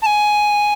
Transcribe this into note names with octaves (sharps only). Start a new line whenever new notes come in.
A5
G#5